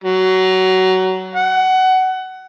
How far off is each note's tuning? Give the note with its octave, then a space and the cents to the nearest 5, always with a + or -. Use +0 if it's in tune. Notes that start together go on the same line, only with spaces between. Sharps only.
F#3 +20
F#5 +20